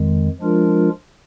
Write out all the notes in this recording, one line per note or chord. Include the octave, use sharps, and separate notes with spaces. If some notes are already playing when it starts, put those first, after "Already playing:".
Already playing: F2 D#3 G#3
F3 G#3 D4 F4 A#4